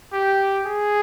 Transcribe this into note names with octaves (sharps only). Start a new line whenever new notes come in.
G4
G#4